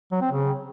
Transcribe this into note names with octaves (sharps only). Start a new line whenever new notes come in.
F#3
C4
C#3